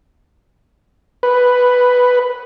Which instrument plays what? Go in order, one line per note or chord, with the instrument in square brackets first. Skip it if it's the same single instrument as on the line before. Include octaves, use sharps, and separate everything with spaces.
[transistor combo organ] B4